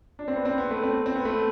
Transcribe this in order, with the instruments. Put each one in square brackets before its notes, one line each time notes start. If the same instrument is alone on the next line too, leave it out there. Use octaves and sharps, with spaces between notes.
[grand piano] D4
C4
B3
C4
B3
A3
C4
C4
B3
A3